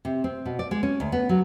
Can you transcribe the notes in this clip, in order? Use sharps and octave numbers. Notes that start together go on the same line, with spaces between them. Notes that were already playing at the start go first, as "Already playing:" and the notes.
C3
C4
B2
D5
G#3
C#4
D2
B3
F#3